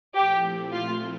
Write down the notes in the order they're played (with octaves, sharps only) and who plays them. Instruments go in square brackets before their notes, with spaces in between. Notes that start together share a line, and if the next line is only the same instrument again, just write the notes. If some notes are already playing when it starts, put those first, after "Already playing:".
[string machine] A#2 F3 A3 C4 E4 [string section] G4
[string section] F4